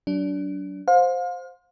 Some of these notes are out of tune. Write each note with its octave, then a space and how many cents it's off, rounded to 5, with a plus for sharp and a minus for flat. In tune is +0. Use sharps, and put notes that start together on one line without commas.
F#3 +30 D4 -25
C5 +0 F5 +35